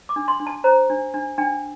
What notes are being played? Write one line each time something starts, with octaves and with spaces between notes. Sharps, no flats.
D6
D4
C6
D4
A5
C5 A#5
D4
D4
D4 G5